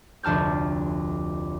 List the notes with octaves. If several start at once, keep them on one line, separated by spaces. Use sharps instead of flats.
F1 D2 A5 F6 G6